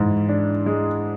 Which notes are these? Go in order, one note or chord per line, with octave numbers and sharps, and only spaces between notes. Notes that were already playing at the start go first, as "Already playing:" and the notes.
Already playing: G#2 E3
D4
G#3